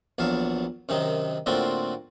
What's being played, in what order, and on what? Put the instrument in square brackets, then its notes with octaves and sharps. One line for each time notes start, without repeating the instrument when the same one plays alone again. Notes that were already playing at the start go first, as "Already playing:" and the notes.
[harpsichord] A#1 E2 F#3 F5 A5
F#2 C3 D#3 D#4
A2 D3 A#3 C4 F4 F#4